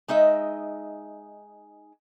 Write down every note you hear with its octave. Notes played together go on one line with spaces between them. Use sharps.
G#3 D#4 D#5 E5